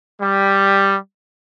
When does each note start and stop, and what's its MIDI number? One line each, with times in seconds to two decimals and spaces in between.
0.21 0.96 55